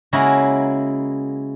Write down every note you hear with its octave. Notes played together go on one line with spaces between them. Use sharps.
C#3 G#3 A#3 E4 F#4 A#4